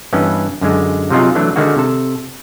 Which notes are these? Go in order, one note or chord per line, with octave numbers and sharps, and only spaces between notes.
G2 E3 B3 C#4 D#5
F#2 D3 G#3
C3 F3 F#3 D#4 F4 G#4
E3 F#3 A3 D4
D3 D#3 G#3 A#3 F#4
C3 A4